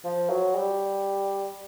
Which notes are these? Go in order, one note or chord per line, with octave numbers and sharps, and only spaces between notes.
F3
F#3
G3